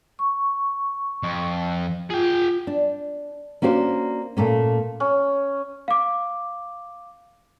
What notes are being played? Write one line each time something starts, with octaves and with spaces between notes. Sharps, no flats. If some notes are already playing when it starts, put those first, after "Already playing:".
C#6
F2
F4 G#4 G5
D4
A#3 C#4 D4 F#4 C5
A#2 A3 A#3 C#4
C#4
F5 D6